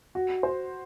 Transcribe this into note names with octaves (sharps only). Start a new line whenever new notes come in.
F#4
C5